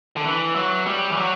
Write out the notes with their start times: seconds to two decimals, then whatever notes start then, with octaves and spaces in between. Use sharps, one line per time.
0.17 D3
0.25 E3
0.55 F#3
0.86 G3
1.12 E3
1.17 F#3